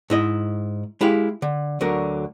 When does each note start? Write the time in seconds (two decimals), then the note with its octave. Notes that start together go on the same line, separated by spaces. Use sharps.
0.10 G#2 E4 D#5
1.01 G#3 E4 G4 F5
1.42 D3
1.81 D2 D3 F#3 A#4